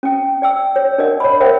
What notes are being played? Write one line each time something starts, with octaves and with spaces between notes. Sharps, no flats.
C#4 G5
D5 G5 E6
C#5
D4 A#4 D5 D#5 F#5
C#5 B5
A#4 C5 E5 F#5 G5